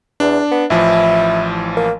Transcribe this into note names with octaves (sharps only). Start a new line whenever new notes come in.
E2 D4
B3
A1 E3 F3 E4
A#3